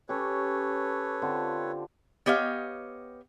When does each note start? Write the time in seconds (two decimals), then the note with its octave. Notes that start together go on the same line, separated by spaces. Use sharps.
0.09 C#4 G4 A4 B4 C#5
1.22 D3 C4 F4
2.26 B3 G4 C#5 D#5 F5